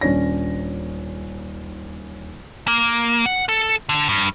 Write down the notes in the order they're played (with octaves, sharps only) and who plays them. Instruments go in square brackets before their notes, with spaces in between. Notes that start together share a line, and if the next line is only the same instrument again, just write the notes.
[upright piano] D#1 C#4 D4 C#5 A#6
[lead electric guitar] A#3
F#5
A4
D3
G2